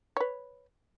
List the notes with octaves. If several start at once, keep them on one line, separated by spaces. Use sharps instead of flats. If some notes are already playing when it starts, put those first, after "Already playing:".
B4 C#5